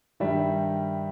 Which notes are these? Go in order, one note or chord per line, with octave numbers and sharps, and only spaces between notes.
G2 D#3 G3 E5